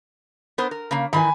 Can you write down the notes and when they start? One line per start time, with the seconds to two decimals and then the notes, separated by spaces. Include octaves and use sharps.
0.58 B3 A#4 C5
0.71 A#4
0.91 C#3 A#3
1.13 D#3 E3 G#5 B5